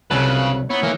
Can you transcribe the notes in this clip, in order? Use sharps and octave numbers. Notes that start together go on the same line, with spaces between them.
C2 C#3 F#3 F4 B4 A5
B3 D#4 E4 C#5
E3 A#3